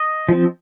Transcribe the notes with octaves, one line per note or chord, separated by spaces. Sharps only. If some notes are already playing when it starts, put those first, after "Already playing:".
Already playing: D#5
F3 C4